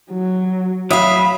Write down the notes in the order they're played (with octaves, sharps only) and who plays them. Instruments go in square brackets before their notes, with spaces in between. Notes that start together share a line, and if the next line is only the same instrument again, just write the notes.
[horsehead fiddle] F#3
[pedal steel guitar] F#3 C#5 D#6 [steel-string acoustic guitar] E5 F5 [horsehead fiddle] B5